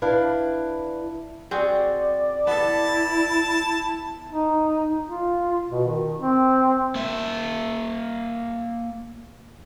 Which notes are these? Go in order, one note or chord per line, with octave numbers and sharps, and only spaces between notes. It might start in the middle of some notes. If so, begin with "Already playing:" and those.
D4 E4 B4 F5
C4 F#4 G#4 D5
B3 E4 A4 A5
D#4
F4
B2
D#3
C4
A#3 E5